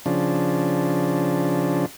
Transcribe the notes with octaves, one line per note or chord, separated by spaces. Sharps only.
C#3 F3 D4